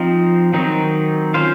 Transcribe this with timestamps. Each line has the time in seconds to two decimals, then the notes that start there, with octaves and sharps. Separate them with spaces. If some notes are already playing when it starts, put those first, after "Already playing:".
Already playing: F3 C4 D#4
0.53 D#3 F#3 C4 D#4
1.34 C#4 F4 C5 F5